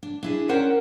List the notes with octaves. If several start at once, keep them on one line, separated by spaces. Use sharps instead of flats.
D4
D4 E4 G#4
C#4 A#4 C5 D5 F#5 G5